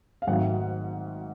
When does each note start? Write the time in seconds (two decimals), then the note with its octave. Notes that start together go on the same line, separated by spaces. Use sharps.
0.22 F5
0.27 G#1 G#2 D#3 F#3 A3 F#5